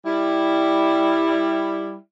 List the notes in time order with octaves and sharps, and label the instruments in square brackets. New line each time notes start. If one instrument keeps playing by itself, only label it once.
[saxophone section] G3 E4